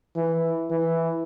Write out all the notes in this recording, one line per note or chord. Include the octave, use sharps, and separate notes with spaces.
E3
E3